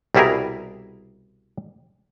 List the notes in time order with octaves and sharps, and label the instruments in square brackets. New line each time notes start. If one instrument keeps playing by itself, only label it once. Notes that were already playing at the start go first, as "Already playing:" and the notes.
[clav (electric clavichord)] C2 B2 G3 E4 G#4 A#4